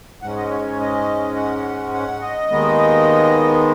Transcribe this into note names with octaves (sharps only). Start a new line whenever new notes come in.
G#2 G#3 C#4 F#5
D#5
C#5
C#5
D#5
F#5
F#5
D#5
D#2 D#3 G#3 B3